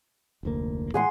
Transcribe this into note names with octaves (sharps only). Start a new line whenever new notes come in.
F1 D2 A#3
A2 E3 G#3 G#4 F#5 C6